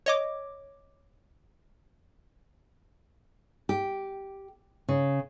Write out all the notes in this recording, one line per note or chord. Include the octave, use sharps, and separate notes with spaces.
C#5 D#5 D6
G4
C#3